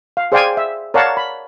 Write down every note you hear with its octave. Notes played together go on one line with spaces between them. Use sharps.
F5
G#4 C5 D5 F5 G5 G#5
E5
A#4 C#5 D5 F5 F#5 A5
B5